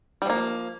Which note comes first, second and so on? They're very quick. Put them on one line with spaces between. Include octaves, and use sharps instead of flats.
G3 F3 A#3